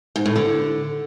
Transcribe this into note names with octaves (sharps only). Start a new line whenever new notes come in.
G#2
A2
D3